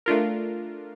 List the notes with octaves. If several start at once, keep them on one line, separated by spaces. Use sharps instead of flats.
A3 D4 F4 A#4